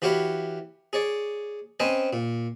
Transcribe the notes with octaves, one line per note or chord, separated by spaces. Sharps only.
E3 F#4 G4 C#5 F5 B5
G#4 C#5 D5
C4 C#4 B4 C5 D#5 G#5
A#2